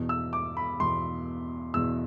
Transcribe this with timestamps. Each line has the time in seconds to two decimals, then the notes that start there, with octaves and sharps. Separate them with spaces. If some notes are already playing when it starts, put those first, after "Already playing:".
Already playing: E2 B2
0.09 E6
0.33 D6
0.57 B5
0.80 E2 B2 C6
1.74 E2 B2 E6